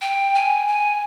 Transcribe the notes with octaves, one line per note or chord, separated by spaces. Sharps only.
G5
G#5
G#5